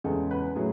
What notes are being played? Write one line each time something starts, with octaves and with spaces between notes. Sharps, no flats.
E2 C#3 G#3 A4
B4
A2 F#3 G#4